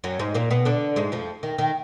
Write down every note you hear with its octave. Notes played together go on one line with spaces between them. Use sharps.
F#2 F#3
G#2 G#3
A#2 A#3
B2 B3
D3 D4
G#2 G#3
F2 F3
D#3
D#3